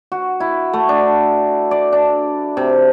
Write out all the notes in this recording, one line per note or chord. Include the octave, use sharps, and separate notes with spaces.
F#4
E4
A3
D4
D5
D4
C3